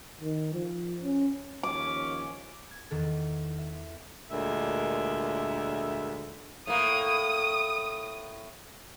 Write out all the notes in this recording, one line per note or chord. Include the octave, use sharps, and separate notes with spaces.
D#3
F3
C#4
D#2 F3 C#4 D6
G#6
E2 D#3 A4
E5
D2 A#2 G#3 A#4 E5
A2 A#3 D#6